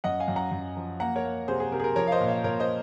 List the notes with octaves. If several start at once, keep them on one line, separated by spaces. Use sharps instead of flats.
F#2 D#5 F#5
F5 G#5
F#2
F#5 A#5
F#2
F3
A#3 F#5 A#5
A#4 C#5
A#3
C3 G#4 C5
G#4
C3 A#4
G#4
A#4
F3 A#4 C#5
F5
C5 D#5
A#2
C#5 F5
A#2 A#4 C#5
C5 D#5